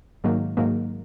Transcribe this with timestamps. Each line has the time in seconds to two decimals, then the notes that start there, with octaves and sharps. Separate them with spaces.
0.24 G#2 D#3 F#3 A#3
0.57 G#2 D#3 F#3 A#3